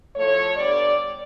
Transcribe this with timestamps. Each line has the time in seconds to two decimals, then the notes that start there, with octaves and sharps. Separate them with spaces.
0.15 A2 F3 A3 C#5
0.57 D3 G3 B3 D5